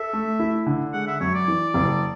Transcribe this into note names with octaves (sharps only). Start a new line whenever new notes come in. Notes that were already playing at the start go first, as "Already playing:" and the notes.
Already playing: A4 E5
A3
E4
D3
G#3 F#5
E5
F#2 C#5
D5
E3
F#1